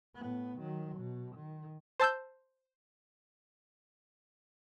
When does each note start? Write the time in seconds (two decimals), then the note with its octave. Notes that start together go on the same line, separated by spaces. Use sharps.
0.15 A2 B3
0.58 D#3 F#3
0.97 B2
1.36 D#3
2.00 C5 A5 E6 G6